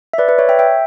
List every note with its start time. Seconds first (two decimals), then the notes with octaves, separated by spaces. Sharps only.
0.13 E5
0.18 B4 D5
0.28 B4 D5
0.39 C#5 E5
0.49 E5 G5
0.59 E5 G5